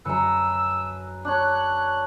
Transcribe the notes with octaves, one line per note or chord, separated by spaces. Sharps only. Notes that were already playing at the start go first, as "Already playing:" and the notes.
F#2 D3 B4 A#5 E6 C#7
D4 C#5 F#6